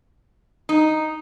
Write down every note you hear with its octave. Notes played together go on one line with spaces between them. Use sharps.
D#4